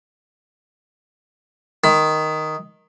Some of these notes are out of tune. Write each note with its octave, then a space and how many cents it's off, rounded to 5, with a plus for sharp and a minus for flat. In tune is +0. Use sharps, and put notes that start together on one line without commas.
D#3 +0 B5 +30